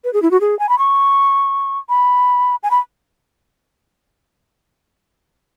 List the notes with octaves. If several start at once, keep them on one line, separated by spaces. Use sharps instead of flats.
B4
G#4
E4
F#4
G#4
G#5
B5
C#6
B5
G#5
B5